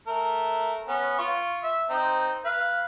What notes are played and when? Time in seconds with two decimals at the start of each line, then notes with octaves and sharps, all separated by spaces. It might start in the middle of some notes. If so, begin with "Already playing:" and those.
0.07 A3 A#4
0.88 B3 C#4
1.19 F4 C#6
1.63 E5
1.90 C4 D#4
2.45 B4 F5